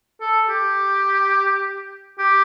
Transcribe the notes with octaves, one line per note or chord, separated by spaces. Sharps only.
A4
G4
G4